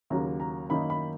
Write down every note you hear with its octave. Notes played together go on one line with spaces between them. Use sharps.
D#2 C#3 F#3 A#3 A#5
A#5
F#2 D#3 A#3 D#4 B5
B5